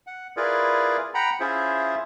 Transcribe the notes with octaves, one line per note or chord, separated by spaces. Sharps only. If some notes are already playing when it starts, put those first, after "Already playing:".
F#5
E4 F4 G#4 A#4 B4 D5
F#5 G5 A#5 B5
C#4 E4 F4 G#4 C5 E5